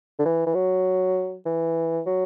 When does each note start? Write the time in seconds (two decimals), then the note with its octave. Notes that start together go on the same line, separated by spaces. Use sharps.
0.19 D3
0.25 E3
0.46 E3
0.55 F#3
1.46 E3
2.06 F#3